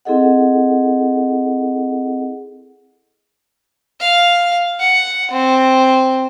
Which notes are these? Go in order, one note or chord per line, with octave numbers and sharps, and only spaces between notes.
C4 E4 G#4 A4 D#5 F#5
F5
F#5
C4